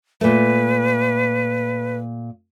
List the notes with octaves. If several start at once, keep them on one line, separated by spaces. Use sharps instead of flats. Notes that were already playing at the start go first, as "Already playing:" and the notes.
A#2 A3 B4